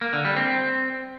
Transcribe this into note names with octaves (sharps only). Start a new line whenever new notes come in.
A#3
D3
G3
C4